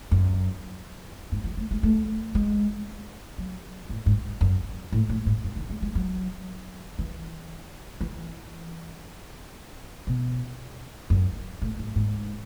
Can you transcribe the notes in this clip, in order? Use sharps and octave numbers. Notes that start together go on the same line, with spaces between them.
F#2
G#2
E3
A3
G#3
A3
G#3
F#3
A2
G#2
F#2
A2
A2
G#2
F#2
D#3
G#3
G#3
F#3
E3
E3
B2
F#2
A2
G#2
G#2